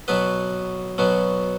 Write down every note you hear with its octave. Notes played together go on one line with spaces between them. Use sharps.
B2 F#3 B3 B4
B2 F#3 B3